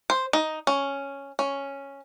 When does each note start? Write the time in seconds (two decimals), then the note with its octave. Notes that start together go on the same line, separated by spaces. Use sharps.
0.10 C5
0.33 D#4
0.67 C#4
1.39 C#4